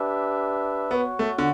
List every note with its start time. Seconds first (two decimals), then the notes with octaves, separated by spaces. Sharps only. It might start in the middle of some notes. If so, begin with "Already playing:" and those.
Already playing: D4 G4 B4 E5
0.91 B3 F#4 C#5 F#5
1.19 A3
1.38 D3